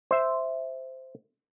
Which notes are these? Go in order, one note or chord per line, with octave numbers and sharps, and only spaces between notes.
C5 E5